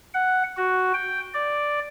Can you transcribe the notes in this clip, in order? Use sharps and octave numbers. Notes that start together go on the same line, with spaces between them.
F#5
F#4
G5
D5